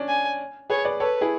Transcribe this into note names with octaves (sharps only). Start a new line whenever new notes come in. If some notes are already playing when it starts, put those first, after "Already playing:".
Already playing: C#4 D4
G#5
G#4 B4 C#5
B4 D5
A4 B4 C#5
E4 G#4